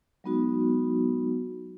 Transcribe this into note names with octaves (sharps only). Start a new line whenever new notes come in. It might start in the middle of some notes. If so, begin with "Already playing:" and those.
F#3 G#3 B3 D#4 F#4